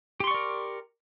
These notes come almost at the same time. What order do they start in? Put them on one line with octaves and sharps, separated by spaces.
G4 C6 C#6 D5 A#4